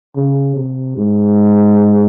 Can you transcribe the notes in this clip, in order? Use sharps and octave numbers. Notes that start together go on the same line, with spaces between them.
C#3
C3
G#2